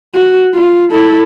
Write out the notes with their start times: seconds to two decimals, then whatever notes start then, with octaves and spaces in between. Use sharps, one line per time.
0.14 F#4
0.54 F4
0.91 E4 A4